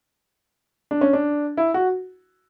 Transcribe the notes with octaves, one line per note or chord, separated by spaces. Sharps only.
D4
C#4
D4
E4
F#4